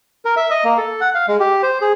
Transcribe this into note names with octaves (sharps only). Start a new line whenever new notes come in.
A#4
E5
D#5
A#3
A4
F#5
F5
G#3
G4
C5
G#4